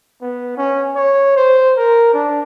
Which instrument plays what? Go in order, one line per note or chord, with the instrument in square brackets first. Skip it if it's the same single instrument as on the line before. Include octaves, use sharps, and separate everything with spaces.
[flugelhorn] B3
C#4
C#5
C5
A#4
D4